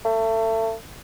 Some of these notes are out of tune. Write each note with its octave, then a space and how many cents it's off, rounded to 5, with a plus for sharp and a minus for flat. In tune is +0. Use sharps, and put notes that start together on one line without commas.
A3 +30